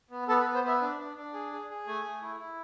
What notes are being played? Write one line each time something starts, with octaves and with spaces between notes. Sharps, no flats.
B3
B3 A4
B4
B3
C5
B3 E5
D4
D4
D4
G#4
G#4
G#4
A3 G#5
A3
E4
E4